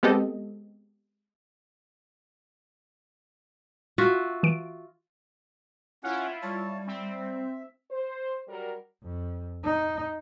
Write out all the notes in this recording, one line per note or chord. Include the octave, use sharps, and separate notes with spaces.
G#3 B3 C4 G4 A4 D#5
F4 F#4 E5
E3 D7
C#4 E4 F4 F#5
G3 C#5 A5
C4 E5
C5
F#3 G3 A#4
F2
D#4